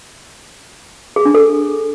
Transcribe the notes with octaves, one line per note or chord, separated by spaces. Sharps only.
G#4
D4
A4